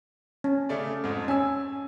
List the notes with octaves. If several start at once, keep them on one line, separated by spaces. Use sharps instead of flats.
C#4
C#3 A3 D5
F2 G#2
C#4 G#5 E6